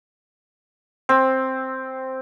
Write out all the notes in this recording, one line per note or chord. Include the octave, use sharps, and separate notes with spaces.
C4